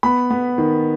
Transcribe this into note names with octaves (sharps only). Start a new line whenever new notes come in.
B3 B5
B3
D#3